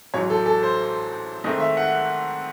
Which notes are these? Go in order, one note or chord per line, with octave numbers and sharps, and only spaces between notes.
A1 G#2 F#3 C#5
A4
A4
C5
G#2 D#3 A3 C4 D#5
E5
F#5